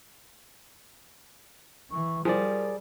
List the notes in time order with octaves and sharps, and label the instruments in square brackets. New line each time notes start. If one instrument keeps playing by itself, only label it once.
[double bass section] E3 [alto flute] C#6
[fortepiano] F3 [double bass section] G3 [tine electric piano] G#4 D5 [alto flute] A#4